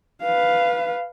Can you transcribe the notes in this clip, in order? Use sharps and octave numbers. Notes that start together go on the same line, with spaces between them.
B4 F5